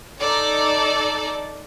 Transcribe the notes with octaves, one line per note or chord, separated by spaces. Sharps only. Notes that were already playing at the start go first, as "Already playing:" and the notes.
D#4 A4 D5